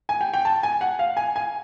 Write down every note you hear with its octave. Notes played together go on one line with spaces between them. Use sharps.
G#5
G5
G5
A5
G#5
F#5
F5
G#5
G#5